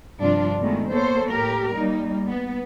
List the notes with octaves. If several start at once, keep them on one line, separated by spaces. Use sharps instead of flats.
G2 C3 F3 D4 F4
B2 D#3 G#3 A3
A#3 B3 A4 C5 C#5
A2 G4 A#4
G3 A#3 D#4
B3